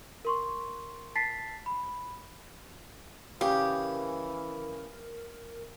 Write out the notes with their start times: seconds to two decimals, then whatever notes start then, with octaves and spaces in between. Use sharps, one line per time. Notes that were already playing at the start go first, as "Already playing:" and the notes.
0.25 A#4 C6 C#6
1.15 A5 A6 B6 C7
1.66 B5
3.41 C#3 E3 G4 A#4